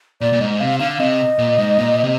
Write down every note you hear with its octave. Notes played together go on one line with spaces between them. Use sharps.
A#2 D5
A#2
G#2 D#5
C3 F5
D3 F5
C3 D#5
A#2
G#2
A#2
C3